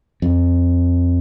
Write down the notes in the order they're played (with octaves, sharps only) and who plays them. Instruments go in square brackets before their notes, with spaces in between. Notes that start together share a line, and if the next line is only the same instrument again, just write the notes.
[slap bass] F2